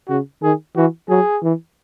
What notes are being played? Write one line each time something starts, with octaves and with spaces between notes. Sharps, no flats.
C#3 F#4
D#3 G#4
E3 F#4
F#3 G#4
E3